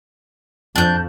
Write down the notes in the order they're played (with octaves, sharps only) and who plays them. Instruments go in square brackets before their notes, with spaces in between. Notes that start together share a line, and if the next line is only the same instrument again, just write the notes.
[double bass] F2 F3 [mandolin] D4 G6